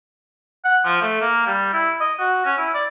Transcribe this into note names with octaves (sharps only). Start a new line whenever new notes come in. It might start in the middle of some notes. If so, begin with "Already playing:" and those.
F#5
F3
A3
A#3
G3
E4
D#5
F#4
C#4
E4
D5